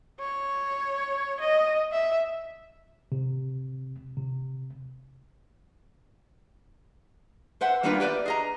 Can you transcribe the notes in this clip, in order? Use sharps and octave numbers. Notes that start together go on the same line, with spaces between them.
C#5
D#5
E5
C3
C3
B4 C5 E5 F#5
G3 A#3 B3 D4 F4 B4
G4 B4 C#5 D5 E5
G#4 D#5 A#5